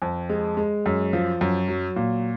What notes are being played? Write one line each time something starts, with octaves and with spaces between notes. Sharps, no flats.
F2
G#3
G#3
F#2
F3
F#2
F#3
A#2